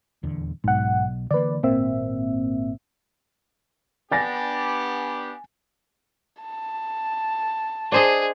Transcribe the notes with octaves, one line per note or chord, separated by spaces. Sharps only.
D#1 E2 D3
B1 G#2 B2 F#5
D3 E3 A#3 B4 D5
G#1 A#2 A#3 C4 E5
B3 D4 G4 G#5 A6 A#6
A5
D4 G#4 C5 D#5